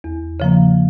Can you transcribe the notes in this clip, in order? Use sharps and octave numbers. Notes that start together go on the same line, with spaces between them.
E2
C#3 F3 A#3